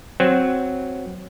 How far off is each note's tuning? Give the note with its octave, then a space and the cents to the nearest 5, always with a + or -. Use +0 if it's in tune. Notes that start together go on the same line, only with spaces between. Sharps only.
F#3 +0 C4 +0